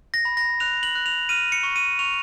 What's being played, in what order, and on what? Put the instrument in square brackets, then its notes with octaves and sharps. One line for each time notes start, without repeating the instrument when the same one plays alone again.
[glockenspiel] A#6
B5
A#6
F#6 F7
F#7
F#6
F7
F6 D#7
C#7
C#6
D#7
C#6 F7